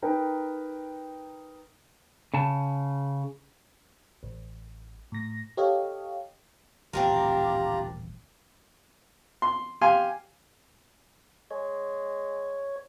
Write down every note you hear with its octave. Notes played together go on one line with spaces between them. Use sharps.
D#4 A#4 B4 G5
C#3 A5
A1
A2 A#6
G4 A4 C#5 D#5 F5
D#1 A1 C4 D4 F4 G4 A#4 A#5
C6
G4 F5 G#5 C6
G#3 C#5